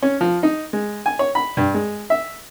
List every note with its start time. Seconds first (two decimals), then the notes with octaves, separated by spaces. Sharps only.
0.02 C#4
0.21 F3
0.43 D#4
0.73 G#3
1.06 G#5
1.19 C#5
1.35 B5
1.57 G2
1.74 G#3
2.10 E5